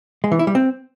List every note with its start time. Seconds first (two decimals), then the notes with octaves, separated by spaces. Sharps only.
0.24 G#3
0.32 E3
0.39 E4
0.47 G3
0.55 C4